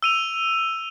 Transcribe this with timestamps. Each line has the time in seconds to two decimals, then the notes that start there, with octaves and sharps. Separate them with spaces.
0.03 E6 D#7 F7